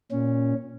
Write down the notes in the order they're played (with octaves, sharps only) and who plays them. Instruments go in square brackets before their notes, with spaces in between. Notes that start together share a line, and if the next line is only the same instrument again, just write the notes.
[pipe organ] A#2 C#4